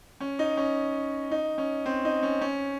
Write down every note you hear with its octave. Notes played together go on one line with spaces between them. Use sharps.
C#4
D#4
C#4
D#4
C#4
C4
D#4
C#4
C#4